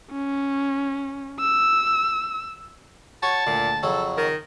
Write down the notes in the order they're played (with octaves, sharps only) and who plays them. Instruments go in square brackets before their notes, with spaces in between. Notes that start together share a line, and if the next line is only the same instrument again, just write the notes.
[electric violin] C#4
E6
[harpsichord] F#4 [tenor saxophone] C#5 [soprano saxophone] A5
[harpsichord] D2 [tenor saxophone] A#2
[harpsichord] F2 C#3 F#3 [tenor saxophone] A4
[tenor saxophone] D#3 [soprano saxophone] A#4